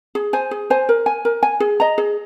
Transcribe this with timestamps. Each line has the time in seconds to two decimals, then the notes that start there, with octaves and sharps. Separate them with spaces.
0.15 G#4
0.33 C5 G#5
0.51 G#4
0.70 C5 G#5
0.89 A#4
1.06 G#5
1.25 A#4
1.43 G#5
1.60 G#4
1.80 D#5 A#5
1.98 G#4